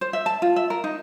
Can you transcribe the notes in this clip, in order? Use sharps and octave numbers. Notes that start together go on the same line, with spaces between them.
C5
E5
A5
F4
E5
A#4
D#4